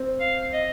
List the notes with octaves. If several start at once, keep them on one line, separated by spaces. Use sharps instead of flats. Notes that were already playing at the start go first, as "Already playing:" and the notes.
Already playing: C4
F5
D#5